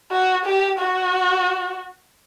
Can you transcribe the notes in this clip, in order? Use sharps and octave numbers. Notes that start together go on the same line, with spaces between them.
F#4
G4
F#4